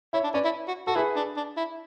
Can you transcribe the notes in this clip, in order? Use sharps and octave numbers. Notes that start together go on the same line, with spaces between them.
E4 C#5 E5
D4
C#4 B4 D5
E4
F#4
F#4 A4
E4 G#4 B4
D4
D4
E4